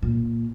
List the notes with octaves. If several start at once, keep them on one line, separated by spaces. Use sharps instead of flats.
A#2